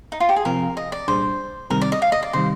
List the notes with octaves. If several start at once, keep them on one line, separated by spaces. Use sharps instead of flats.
D#4
F4
G4
G#4
C3 F3 C4 A#4
D#5
D5
C2 A#2 G3 D4 G#4 C5
C2 C3 D#3 G3 C4 A#4
D5
D#5
F5
D#5
D5
C3 D#3 G3 C5